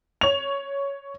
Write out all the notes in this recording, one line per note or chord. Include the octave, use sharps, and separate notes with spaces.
C#5 F7